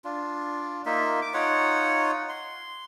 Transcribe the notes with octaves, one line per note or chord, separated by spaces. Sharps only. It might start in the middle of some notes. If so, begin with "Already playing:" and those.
D4 F4
A#3 D#4 F4 E5
D6
D#4 F4 C#5 F#5
C6